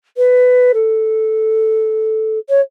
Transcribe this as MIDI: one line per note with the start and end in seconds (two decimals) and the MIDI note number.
0.17 0.72 71
0.74 2.39 69
2.49 2.61 73